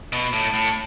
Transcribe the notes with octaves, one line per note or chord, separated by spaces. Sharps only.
B2
A2
A2